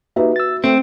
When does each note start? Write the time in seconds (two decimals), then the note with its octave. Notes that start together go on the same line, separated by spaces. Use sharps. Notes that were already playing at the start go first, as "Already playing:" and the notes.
0.16 A#3 D#4 F#4 G4 B4 E5
0.36 E6 A6
0.64 A3 C4